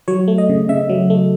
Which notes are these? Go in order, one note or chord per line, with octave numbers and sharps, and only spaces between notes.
F#3 C#5
A3
D#5
C#3
C#3 E5
F#3
A3